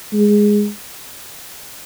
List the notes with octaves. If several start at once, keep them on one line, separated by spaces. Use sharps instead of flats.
G#3